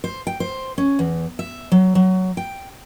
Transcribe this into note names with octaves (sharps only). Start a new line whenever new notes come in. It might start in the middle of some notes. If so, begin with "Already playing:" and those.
C5
G5
C5
C#4
E2
E5
F#3
F#3
G5